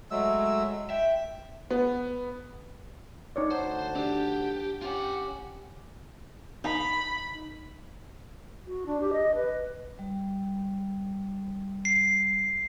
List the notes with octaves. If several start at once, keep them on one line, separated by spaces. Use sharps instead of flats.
F#3 G#3 A3 E6
E5 G5
B3
D#4 C#5 D5
D2 C5 F#5 A5
D4 G4
C#4 F4 G4 F#5
D#4 B5
F#4
D4
G4
D#5
B4
G3
C7